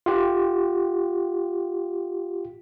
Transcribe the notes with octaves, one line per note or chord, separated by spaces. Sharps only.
F4 G4